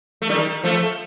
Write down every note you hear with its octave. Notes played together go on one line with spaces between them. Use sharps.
A3
D#3 G3
F3 A3